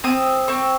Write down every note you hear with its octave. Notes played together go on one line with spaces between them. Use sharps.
C4 D#6
C4 C#6